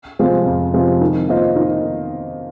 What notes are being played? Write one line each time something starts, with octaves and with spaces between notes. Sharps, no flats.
C3 F3 G#3 C4
F2
C3 F3 G#3 C4
D#3
A#3 F4 C5 D#5
D#3